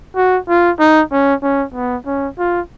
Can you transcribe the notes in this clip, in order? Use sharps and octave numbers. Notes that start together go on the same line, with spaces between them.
F#4
F4
D#4
C#4
C#4
B3
C#4
F4